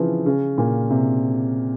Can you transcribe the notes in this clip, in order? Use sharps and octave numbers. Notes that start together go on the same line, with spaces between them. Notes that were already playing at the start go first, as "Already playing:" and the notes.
Already playing: C#3 E3 F3 C4
C#3
A#2
C3